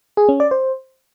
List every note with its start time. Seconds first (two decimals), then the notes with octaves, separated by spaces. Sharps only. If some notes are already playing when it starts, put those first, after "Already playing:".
0.17 G#4
0.29 C#4
0.40 D5
0.51 C5